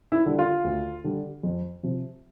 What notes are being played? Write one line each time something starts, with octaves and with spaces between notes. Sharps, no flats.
E4
D3 G3
F4
D2
D3 G3
F2
C3 F3